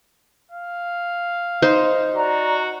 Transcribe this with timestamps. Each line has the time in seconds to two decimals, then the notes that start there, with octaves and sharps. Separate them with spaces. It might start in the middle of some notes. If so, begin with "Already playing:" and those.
0.51 F5
1.62 D#4 C5
2.14 F#4 D5 A#5